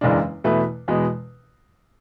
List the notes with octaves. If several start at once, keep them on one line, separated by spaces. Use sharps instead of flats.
F#1 E2 C#3 G#3 D4
E2 B2 A3 E4 B4
E2 B2 G#3